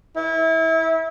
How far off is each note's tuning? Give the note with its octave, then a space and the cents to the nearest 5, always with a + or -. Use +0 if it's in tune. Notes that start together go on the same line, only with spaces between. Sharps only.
E4 -25